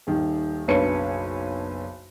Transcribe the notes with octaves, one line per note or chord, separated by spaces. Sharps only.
D#1 D#3
F#1 B1 D4 B4 C#5 C#7